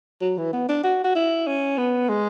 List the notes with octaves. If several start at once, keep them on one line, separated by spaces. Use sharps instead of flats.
F#3
E3
B3
D4
F#4
F#4
E4
C#4
B3
G#3